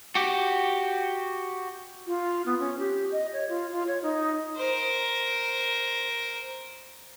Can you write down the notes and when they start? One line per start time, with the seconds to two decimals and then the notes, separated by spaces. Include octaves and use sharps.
0.15 F#4 G4
2.06 F4
2.46 B3
2.59 C#4
2.79 G4
3.11 D#5
3.32 C#5
3.48 F4
3.72 F4
3.87 C#5
4.02 D#4
4.57 A#4 C5